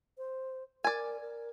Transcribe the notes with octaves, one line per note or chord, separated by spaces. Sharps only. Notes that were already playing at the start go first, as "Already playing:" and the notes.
C5
A#4 D5 G#5
A#4